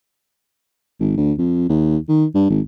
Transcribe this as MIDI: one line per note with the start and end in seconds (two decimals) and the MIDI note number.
1.00 1.14 32
1.18 1.33 38
1.38 1.66 41
1.69 1.98 39
2.09 2.25 51
2.35 2.47 43
2.50 2.60 32